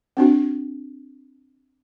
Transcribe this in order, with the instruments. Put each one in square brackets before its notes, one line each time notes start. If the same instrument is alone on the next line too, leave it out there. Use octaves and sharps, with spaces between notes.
[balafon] C4 D4 F#4